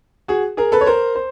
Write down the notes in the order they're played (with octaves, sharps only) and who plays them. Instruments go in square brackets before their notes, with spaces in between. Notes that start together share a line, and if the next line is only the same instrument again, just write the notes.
[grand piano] F#4 G#4
G#4 A#4
A4 B4
C#5
A#4 C5
C5